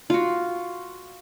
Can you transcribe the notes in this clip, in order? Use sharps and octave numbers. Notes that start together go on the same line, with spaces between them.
F4 F#4